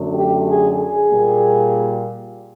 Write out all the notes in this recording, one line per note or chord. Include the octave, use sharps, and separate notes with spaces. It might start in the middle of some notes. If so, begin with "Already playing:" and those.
Already playing: F#2 D3 F#3 A3
G4
G#4
G#4
A#2 G3 A#3